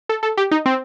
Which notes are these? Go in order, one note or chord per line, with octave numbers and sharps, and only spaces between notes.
A4
A4
G4
D#4
C4